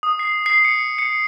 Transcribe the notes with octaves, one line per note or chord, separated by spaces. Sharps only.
D#6
C7
C7
C#7
C#7